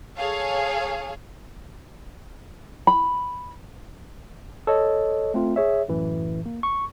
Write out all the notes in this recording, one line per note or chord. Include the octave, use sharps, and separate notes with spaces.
G#4 A4 C#5 F5
B5
A4 C#5 D#5
A3 C4 F4
G#4 C#5 E5
F#2 A2 E3
A#3
C#6